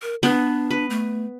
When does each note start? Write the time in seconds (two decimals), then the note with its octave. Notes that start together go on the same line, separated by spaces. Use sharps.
0.02 A#4
0.23 B3 D4
0.71 B4
0.90 A3